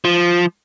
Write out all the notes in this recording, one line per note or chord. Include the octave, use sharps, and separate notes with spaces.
F3